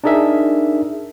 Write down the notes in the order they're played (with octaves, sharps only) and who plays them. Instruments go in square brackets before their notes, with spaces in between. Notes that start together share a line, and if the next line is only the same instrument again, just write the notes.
[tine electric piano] D4 D#4 G#4 A#4 E5